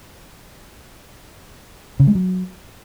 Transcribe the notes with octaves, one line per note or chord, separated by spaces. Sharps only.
C#3
G#3
F#3